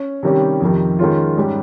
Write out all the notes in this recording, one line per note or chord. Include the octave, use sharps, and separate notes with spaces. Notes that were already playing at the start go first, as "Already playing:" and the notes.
Already playing: C#4
C3 D#3 G3 C#4 G4
F2 C3 D#3
D#3 G#3 C#4 F4
G#2 G3 C#4 G4